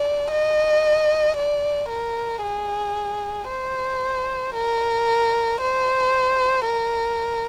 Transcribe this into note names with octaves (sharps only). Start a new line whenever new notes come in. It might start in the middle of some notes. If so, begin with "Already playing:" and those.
Already playing: D5
D#5
D5
A#4
G#4
C5
A#4
C5
A#4